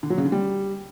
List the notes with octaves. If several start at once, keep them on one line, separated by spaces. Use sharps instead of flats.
D3
F#3
C#3
D3
G3